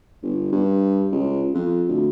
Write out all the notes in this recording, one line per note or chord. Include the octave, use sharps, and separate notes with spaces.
G1
G2
C#2
F2
D2